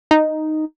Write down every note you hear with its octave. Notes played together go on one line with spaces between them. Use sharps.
D#4